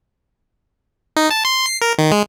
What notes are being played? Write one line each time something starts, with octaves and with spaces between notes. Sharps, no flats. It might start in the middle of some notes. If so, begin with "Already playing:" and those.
D#4
A5
C6
C7
A#4
D#3
G#3